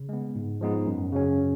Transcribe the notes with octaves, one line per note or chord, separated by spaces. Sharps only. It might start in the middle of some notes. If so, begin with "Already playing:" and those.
Already playing: C#3
G#3 B3
G#2
F3 G#3 B3 D#4
F#2
C#3 F#3 C#4